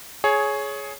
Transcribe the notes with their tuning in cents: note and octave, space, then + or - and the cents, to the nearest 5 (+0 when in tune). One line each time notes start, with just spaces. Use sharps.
G#4 +15 C#5 +0